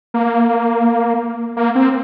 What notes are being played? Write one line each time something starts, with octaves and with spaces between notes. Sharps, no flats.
A#3
A#3
C4